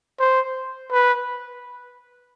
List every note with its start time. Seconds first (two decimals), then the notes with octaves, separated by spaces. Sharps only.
0.19 C5
0.91 B4